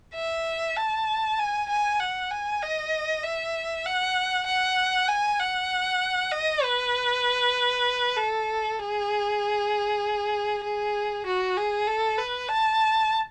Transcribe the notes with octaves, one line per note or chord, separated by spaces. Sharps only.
E5
A5
G#5
G#5
F#5
G#5
D#5
E5
F#5
F#5
G#5
F#5
D#5
B4
A4
G#4
G#4
F#4
G#4
A4
B4
A5